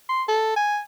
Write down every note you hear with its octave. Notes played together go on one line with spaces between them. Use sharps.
C6
A4
G#5